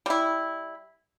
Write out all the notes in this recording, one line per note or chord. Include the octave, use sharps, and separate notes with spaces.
G3 E4